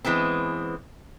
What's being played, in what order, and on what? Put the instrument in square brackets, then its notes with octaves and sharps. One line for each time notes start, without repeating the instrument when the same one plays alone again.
[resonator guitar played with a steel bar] E3 G#3 B3 C4